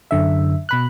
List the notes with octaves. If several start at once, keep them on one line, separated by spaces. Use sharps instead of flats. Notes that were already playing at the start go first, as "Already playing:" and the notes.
F#2 D3 E5
B2 B5 F#6